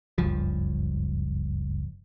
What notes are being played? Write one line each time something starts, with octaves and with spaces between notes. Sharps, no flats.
F#1 C#2 G2 F3